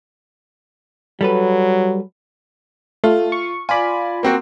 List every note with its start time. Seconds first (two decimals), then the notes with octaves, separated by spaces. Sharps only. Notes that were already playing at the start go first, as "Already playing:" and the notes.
1.21 F#3 G3 A4 B4
3.04 A3 F4
3.32 C#6
3.69 F4 D5 G#5 B5
4.23 A#3 C4 F#4